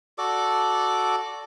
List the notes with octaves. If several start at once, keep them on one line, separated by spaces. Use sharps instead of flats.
F#4 A4 D5 D6